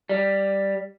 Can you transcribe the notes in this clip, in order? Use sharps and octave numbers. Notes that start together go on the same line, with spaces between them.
G3